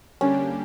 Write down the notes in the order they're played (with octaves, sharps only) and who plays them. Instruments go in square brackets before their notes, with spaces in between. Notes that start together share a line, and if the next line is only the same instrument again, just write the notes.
[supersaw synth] D3 G3 A#3 D4 G4 [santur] C#4